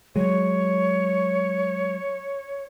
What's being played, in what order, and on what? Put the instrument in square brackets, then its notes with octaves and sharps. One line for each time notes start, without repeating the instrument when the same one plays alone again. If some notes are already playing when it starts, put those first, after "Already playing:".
[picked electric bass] F#3 G#3 [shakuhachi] C#5